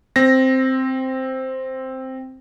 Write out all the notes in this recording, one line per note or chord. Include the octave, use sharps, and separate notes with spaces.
C4 A#6